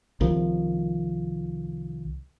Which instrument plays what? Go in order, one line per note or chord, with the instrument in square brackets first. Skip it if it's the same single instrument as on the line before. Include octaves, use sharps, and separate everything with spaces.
[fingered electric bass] C2 D#3 F3